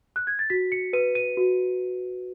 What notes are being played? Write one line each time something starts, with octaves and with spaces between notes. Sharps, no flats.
F#6
G#6
A6
F#4 B6
C#7
B4 D#7
D#7
F#4